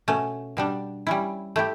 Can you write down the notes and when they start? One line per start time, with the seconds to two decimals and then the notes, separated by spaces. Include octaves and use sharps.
0.08 B2 A3 C#4
0.57 B2 G3 D4
1.07 G3 C#4 E4
1.56 A3 E4 G4